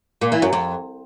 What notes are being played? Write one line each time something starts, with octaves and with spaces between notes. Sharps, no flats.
A#2
E3
F#2
F2